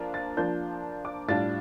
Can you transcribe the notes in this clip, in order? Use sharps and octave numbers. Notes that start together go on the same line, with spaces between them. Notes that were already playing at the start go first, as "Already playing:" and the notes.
Already playing: F3 A#3 D4 F4
A6
F3 A#3 D4 F4 G6
D6
A2 G3 D4 F4 A6